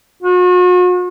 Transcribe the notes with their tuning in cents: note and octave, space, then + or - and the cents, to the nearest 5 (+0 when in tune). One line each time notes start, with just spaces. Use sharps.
F#4 -40